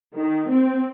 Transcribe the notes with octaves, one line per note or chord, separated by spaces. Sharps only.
D#3
C4